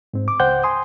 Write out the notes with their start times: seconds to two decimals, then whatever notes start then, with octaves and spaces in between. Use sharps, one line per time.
0.14 G#2 C4
0.28 D6
0.40 C#2 C5 F#5 G5 G6
0.64 G#5 C6 D#6